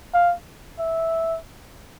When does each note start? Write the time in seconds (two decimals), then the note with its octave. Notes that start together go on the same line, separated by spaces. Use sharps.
0.14 F5
0.79 E5